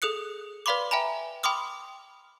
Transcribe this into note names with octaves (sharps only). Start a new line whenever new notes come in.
G#4 A4 D#6 F#6 C#7
B4 D5 F5 B5 C6 D6
E5 G5 G#5 A#5 B5
G5 B5 C6 D6 D#6 F6